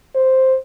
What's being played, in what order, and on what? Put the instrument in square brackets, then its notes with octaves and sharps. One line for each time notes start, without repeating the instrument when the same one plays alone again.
[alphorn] C5